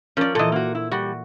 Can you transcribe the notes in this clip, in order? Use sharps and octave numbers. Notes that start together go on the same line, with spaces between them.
F3 C#4 A#4 D5
A#2 E3 A4 D#5
A#3 F#4
E4
G3 F#4